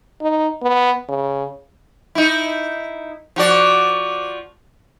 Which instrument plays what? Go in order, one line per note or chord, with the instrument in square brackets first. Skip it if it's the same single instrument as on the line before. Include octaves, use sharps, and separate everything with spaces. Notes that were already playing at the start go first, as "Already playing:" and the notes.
[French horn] D#4
B3
C#3
[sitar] D#4 E4
F3 F#4 D5